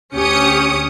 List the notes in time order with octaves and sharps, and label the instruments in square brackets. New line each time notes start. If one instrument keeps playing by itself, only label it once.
[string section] D2 C#4 G4 D#6 C#7